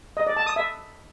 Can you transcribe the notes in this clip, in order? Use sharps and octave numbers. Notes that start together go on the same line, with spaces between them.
D#5
D5
A5
D#6
E5